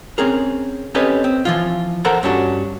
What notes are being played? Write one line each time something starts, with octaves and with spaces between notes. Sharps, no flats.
C4 C#4 G#4 A#4
C4 C#4 G4 A4 B4 D#5
C4
E3 F3 F4
A4 A#4 C5 D5 F#5 A#5
G2 C#4 D4 F#4